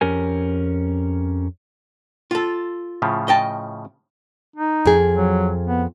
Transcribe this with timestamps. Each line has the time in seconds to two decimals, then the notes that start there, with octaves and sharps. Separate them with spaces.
0.01 F2 C#4 G4 A#4 G#5
2.31 F4 A4
3.02 A2 C#3 F3
3.28 D#5 G5 A5
4.56 D#4
4.85 F2 G#4
5.15 F#3
5.67 B3